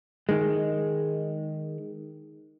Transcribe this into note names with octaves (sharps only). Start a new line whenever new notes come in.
D#3 G#3